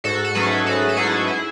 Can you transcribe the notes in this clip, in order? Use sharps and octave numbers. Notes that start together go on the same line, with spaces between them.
G#2 F#4 A4
A4
F#3 A3 C#4 G#4 B4
G#2 F#4 A4
A4
F#3 A3 C#4 E4 G#4
E4 G#4